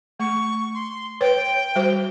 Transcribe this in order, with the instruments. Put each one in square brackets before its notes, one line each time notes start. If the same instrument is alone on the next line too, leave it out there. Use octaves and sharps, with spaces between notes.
[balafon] A3 [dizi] C#6
[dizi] C6
[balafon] B4 C#5 [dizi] G5
[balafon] G3 F#4 C5